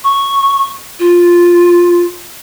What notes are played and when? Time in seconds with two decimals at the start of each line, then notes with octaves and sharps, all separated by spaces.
0.04 C#6
0.99 F4